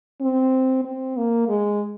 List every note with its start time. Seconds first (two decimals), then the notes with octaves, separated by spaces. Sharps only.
0.21 C4
0.85 C4
1.17 A#3
1.48 G#3